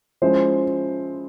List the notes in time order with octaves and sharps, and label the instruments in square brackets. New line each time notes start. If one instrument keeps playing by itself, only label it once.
[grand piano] F3 G#3 C#4 E4 C5